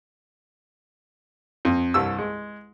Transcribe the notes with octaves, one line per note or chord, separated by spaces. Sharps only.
F2
C2 G2 E6
G#3